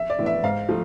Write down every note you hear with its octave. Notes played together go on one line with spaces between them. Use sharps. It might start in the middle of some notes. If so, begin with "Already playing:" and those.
Already playing: E5
D5
A2 E3 B3 E4
E5
G#2 F5
F3 A3